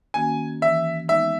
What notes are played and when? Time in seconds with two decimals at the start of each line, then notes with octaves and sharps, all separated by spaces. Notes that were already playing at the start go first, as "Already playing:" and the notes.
0.14 D#3 A#3 C#4 F#4 G#5
0.62 E3 E5
1.09 G#3 B3 D#4 E5